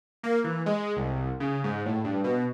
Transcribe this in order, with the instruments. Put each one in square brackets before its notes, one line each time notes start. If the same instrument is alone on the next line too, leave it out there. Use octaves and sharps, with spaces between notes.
[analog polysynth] A#3
E3
G#3
C2
C#3
G#2
A2
G2
B2